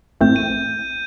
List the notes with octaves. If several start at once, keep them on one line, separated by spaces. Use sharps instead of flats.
A1 A2 A3 C4 G6
D#7